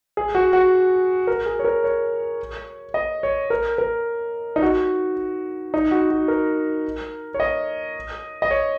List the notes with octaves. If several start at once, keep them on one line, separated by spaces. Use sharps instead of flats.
G#4
F#4
F#4
A#4
G#4
C#5
A#4
C#5
D#5
C#5
A#4
A#4
D#4
F#4
D#4
F#4
F#4
A#4
C#5
D#5
D#5
C#5